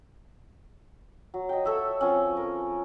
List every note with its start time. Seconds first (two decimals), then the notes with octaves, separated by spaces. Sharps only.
1.34 F#3
1.49 D#5 G5
1.65 A4 C#5 E5 F#5
2.01 F3 C4 C#4
2.37 A#4